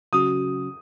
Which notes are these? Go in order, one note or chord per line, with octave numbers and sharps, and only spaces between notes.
C#3 F#3 C#4 F#4 D#6